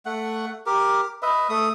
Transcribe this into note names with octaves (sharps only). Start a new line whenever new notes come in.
A3 F#5
G4 A#4
B4 D#5 E5
A3 D#6